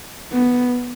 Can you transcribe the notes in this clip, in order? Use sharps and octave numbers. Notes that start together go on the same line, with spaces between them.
B3